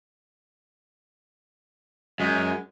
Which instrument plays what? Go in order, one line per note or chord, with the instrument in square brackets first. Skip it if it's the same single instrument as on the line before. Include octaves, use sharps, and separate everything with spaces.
[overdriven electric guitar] F#2 [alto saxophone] G#3